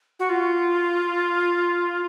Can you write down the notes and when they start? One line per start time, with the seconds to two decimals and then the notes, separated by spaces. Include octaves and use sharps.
0.19 F#4
0.29 F4